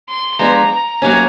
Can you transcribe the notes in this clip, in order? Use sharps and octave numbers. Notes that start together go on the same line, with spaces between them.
C6
F3 G#3 B3 D4 A#5
A#5
A2 F#3 A#3 C#4